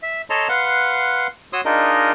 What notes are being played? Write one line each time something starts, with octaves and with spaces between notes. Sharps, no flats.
E5
A4 C#5 D#5 A5 A#5 C6
B4 F5 F#5 C6
F#4 C#5 C6 D#6 E6
D4 D#4 F4 G#4 A#4 D#5